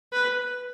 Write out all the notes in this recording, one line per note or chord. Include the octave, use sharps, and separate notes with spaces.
B4